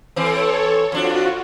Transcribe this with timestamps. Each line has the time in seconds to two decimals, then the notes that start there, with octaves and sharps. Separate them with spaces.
0.16 E3 C4 A4 C#5
0.92 F2 D4 F4 F#4